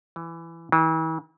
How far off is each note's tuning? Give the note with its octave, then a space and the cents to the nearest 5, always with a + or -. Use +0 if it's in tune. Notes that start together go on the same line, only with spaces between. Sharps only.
E3 +15
E3 -40